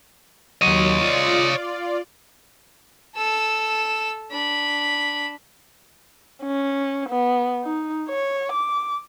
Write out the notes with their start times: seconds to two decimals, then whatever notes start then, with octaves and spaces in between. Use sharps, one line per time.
0.62 D#2 F#3 C#5 D#5
1.01 F4 D5
3.16 A4 E6
4.31 D4 B5
6.42 C#4
7.09 B3
7.64 D#4
8.09 C#5
8.52 D6